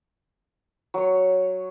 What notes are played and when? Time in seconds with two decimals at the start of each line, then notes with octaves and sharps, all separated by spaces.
0.94 F#3 C#5